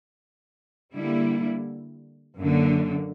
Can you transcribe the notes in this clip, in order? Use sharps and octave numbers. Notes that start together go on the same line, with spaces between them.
D3 G3 A#3 E4
F#2 D3 A#3